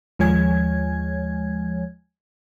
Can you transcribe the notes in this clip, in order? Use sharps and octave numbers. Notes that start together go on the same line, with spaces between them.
D#2 F3 G#3 C#5 G#5 G#6